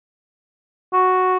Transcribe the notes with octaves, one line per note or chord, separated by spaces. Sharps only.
F#4